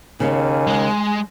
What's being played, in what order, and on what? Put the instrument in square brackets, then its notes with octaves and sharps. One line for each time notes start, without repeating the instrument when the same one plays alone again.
[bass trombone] D#2 [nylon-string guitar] C#3 C#4 [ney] G#5
[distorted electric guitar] G#3